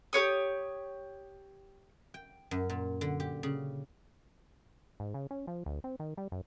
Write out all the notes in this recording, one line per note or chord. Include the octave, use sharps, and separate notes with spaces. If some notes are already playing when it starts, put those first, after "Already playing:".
G4 B4 C#5 D#6
G5
F#2
A#2
D3
G4
C#3
G#2
C#3
C#4
F3
D2
C4
D#3
G3
F#2